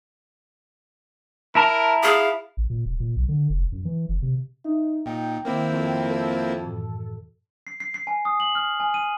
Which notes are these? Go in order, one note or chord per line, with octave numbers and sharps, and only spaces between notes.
E4 A#4 A5 A#5
G#4 F5
A1
A#2
D1
A#2
B1
D3
F1
F#2
E3
F#1
C3
D#4 E5
A#2 D#4 G5
D#3 A#3 C4 E4 D6
F2
A4
F#2 A2 E3
C7
C7
C7
G#5
D#6
F#7
F6
G#5
D#7